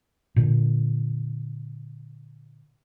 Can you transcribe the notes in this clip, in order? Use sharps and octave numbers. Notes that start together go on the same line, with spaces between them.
A#2 D3